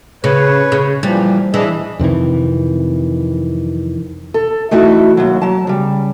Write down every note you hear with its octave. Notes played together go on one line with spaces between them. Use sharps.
C#3 B4 C#5
C#3
A#2 E3 F3 G3
E3 D4 G#4 D#5
F2 C3 D#3 E3
A4
E3 A3 D#4 E4 F#4
D#2 F#3
F#3 A5
C#3 G3